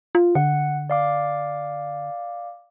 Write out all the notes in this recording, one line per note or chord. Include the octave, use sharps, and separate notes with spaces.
F4
D3 F#5
D5 F5 D6